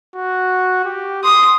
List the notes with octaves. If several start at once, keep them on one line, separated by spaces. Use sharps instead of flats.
F#4
G4
C6 D#6